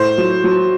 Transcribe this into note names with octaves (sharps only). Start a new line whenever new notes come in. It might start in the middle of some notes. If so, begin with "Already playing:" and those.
Already playing: A2 C5
F#3
F#3